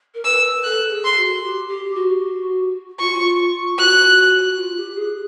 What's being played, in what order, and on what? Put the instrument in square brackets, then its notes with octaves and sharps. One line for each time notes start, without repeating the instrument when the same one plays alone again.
[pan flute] A#4
[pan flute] B4 [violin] E6
[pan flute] A4 [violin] F#6
[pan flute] G#4
[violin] C6
[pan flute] F#4
G4
G4
F#4
[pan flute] F4 [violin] C#6
[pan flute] F#4 [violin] F#6
[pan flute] F4
G4
G#4